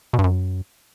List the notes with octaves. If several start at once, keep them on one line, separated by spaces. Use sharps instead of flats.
B2
G2
F#2